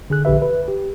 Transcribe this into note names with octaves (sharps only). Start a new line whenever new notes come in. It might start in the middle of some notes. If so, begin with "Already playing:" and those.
D3 G#4 F#6
A#1 D3 G4 B4 E5
B4
G4